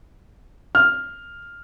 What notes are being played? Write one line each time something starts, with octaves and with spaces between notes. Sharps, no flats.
F6